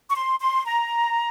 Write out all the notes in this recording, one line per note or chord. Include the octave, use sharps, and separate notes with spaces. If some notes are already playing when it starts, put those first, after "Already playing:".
C#6
C6
C6
A#5